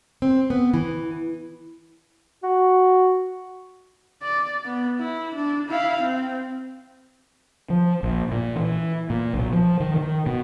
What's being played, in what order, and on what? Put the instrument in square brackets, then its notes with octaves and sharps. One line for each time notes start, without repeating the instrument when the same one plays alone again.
[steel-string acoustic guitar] C4
B3
E3
[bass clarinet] F#4
[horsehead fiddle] D5
B3
E4
D4
E4 F5
C4
[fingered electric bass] F3
A#1
A#2
E3
A#2
B1
F3
D#3
D#3
B2